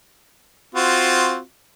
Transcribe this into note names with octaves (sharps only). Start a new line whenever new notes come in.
C4 F4 F#4